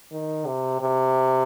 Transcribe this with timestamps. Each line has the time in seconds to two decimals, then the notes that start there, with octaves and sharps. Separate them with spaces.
0.12 D#3
0.46 C3
0.81 C3